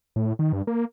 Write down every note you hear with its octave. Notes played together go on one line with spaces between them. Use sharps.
A2
D#3
G2
A#3